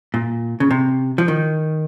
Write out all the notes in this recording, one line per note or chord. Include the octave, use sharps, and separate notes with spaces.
A#2
C#3
C3
F3
D#3